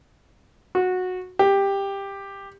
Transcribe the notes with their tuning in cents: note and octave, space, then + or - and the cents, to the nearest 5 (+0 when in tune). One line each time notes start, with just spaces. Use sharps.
F#4 -15
G4 +10